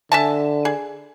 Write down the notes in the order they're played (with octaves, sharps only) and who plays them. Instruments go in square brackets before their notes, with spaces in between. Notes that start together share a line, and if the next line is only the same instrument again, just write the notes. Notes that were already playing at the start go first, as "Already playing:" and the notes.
[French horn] D3 [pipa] E5 G#5 A5
[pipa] G#4